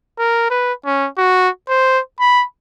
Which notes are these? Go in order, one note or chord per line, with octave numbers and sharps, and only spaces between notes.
A#4
B4
C#4
F#4
C5
B5